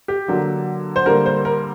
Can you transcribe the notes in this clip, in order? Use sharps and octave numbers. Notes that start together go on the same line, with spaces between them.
G4
D3 F#3 A#3
C5
D3 G3 A#3 A#4
C5
A#4